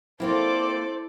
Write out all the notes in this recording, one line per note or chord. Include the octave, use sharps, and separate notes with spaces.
A#3 C4 E4 F4 A4 C5 D5 D6